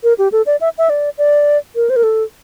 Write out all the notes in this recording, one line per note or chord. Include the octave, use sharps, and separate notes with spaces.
A#4
G4
A4
D5
E5
E5
D5
D5
A#4
C5
A#4
A4